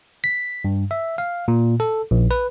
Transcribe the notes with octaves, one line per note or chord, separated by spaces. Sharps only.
B6
G2
E5
F5
A#2
A4
A#1
B4